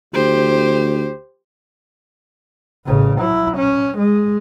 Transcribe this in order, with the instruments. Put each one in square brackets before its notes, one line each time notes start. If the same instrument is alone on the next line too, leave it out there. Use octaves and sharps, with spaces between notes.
[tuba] D2 [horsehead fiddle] G4 C5
[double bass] A1 C#3
F#3 E4
C#4
G#3